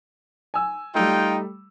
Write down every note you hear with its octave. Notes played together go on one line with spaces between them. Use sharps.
G#5 E6
G3 A3 D#4 F4 G5